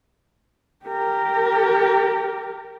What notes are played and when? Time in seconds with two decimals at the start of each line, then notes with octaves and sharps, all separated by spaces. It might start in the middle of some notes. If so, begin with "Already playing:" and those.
0.85 G4 A#4